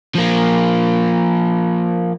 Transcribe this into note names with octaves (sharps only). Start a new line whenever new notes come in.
F3 A#3